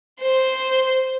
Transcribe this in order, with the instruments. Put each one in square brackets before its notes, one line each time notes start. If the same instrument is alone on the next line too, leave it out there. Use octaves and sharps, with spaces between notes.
[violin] C5